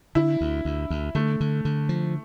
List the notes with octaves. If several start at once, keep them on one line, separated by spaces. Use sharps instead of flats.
D3 E4
D2
D2
D2
D3 A3
D3
D3
F3